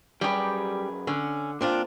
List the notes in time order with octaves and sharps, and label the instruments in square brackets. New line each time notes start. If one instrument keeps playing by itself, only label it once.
[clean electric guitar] F#2 G#4 B4 [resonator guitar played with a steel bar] G3 G4
[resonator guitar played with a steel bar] D3 [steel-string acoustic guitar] C#4
[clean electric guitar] A#2 [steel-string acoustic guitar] C4 D4 F4